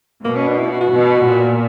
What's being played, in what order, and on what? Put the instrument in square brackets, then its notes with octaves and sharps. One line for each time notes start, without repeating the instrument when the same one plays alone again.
[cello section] B2 [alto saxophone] A#3
[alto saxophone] C#4
D4
E4
F#4
F#4
[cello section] B2
A#2